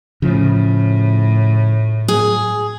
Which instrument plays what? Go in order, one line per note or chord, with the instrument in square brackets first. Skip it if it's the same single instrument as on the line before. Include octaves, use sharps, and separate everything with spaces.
[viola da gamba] A2 [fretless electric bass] C#3 F3
[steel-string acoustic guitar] G#4